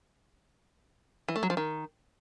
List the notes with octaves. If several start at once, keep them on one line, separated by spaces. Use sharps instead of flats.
E3
A3
F#3
F3
D#3